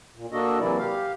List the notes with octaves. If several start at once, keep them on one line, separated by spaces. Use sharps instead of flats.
A#2
A#3 D4 F#4 A4 D#5
C3 E3 F#3 A#3 E4 D5
G4 F5